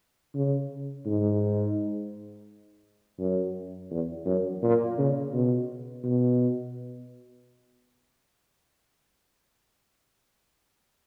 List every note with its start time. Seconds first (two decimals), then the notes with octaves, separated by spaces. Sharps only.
0.35 C#3
1.06 G#2
3.19 F#2
3.90 E2
4.26 F#2
4.62 A#2
4.98 C#3
5.33 B2
6.04 B2